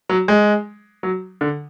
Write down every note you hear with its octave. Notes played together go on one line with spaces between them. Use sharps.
F#3
G#3
F#3
D3